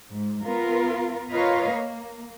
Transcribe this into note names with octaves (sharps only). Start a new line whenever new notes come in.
G#2
B3 F4 A#4
F4 A#4 B4 C#5 D#5 F5
A#3